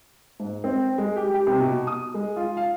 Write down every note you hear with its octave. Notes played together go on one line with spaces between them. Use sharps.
G#2
C4
G#3
G4
G4
C3
B2
D#6
G#3
F4
F5